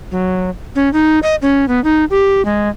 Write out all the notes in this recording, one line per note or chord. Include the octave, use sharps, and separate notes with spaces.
F#3
C#4
D#4
D#5
C#4
B3
D#4
G4
G#3